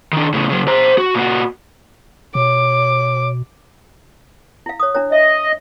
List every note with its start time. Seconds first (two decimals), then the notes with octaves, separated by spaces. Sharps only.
0.13 D#3 D4
0.34 A2 C#3
0.49 C#3 F#3
0.68 C5 A#5
0.98 F#4
1.15 A#2 F#4
2.35 B2 C#5 D6
4.66 E4 F5
4.80 C#5 D#6
4.95 D4 E4 C#5
5.12 D#5 E5